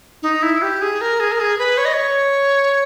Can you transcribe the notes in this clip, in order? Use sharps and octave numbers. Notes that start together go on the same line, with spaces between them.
D#4
E4
G4
G#4
A#4
G#4
A#4
G#4
B4
C#5
D#5
C#5